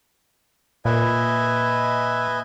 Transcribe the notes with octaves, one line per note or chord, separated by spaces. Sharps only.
A#2 B4 D#5 E5 G#5